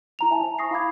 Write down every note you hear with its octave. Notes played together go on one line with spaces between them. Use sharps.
E4 A#5 F7
E5 G#5 A5
C5
C#6 D#6 A#6 C7
E4 F5 B5 D6 G#6